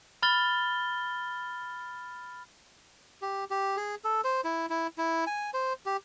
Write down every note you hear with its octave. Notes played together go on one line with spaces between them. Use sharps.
B5 F6 A6 G7
G4
G4
G#4
A4
C5
E4
E4
E4
G#5
C5
G4